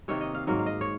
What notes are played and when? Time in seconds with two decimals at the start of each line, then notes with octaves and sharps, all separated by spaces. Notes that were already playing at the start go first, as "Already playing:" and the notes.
0.08 C3 D#3 A#3 C#5
0.21 D#5
0.34 F5
0.47 G#2 F#3 A#3 F5
0.59 F5
0.66 D#5
0.81 C#5